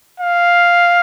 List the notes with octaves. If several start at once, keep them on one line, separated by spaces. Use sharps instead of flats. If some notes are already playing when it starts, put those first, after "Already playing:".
F5